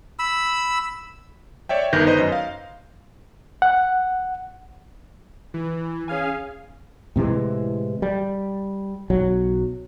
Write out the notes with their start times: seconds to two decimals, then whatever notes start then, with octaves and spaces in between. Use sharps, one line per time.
0.19 B5 E6
1.69 C#5 D5 E5 G5
1.93 G1 D#3 B4 G6 A#6
2.05 D#4 B4 C5 D#5
2.18 F#2
2.32 F5
3.62 F#5
5.54 E3
6.08 C#4 G#4 F5 G#5
7.16 A2 C3 E3 G#3
8.02 G3
9.10 B1 F#3